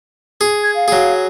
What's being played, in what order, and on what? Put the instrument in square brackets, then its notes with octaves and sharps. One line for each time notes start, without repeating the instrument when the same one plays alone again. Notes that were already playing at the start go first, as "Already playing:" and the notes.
[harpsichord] G#4
[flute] G#6
F5
[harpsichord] F#3 G#4